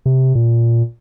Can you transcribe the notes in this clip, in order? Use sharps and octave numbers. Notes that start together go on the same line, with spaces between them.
C3
A#2